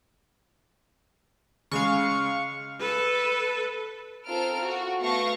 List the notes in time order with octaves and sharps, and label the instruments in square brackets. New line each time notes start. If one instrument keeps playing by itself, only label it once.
[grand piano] C#3 G#3 [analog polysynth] F5 C#6
[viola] A4 B4
[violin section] C4 F4 A4 A#4 F6 D7
F#4
A3 B3 F5 C#6 A#6 C#7